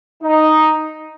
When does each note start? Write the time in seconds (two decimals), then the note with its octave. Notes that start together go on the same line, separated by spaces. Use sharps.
0.23 D#4